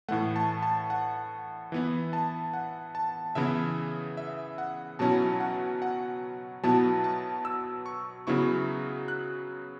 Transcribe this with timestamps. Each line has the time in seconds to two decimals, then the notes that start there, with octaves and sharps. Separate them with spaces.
0.09 A2 E3 A3 F#5
0.36 A5
0.62 A5
0.90 F#5
1.72 E3 B3 E4
2.13 A5
2.54 F#5
2.95 A5
3.35 C#3 E3 B3 E4 E5
4.17 E5
4.58 F#5
4.99 B2 F#3 C#4 E4 A5
5.40 F#5
5.82 F#5
6.63 B2 F#3 B3 E4 A5
7.04 A5
7.45 E6
7.86 C#6
8.27 C#3 F#3 B3 E4 C#6
9.08 F#6